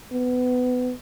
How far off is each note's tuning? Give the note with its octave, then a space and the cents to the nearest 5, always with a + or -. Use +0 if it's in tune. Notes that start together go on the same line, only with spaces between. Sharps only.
B3 +20